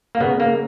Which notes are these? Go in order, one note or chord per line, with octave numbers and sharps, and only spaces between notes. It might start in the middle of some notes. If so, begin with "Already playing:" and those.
A#3
C#3 B3
A#3